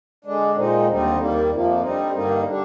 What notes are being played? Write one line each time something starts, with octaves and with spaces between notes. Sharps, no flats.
D3 G#3 D4
A#2 G#3 C4 D#4
D#2 D3 G3 C4 D#4
D#2 D#3 G3 A#3
F2 C3 F3 A#3
D3 G3 C4 D#4
G2 D3 G3 A#3 D#4
D3 G3 D4